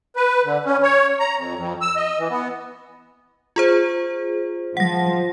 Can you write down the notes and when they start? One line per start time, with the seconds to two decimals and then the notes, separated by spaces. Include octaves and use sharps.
0.16 B4
0.45 D3
0.66 C#4
0.83 C#5
1.20 A#5
1.37 F2
1.56 F2
1.81 E6
1.96 D#5
2.18 E3
2.30 B3
3.56 F4 G#4 C5
4.77 F3 F#5 A#6